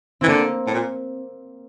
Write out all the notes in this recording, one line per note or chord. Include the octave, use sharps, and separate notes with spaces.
E3 C4
D3 A#3
A2
A#2